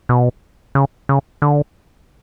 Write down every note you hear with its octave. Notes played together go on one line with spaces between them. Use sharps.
B2
C#3
C#3
D3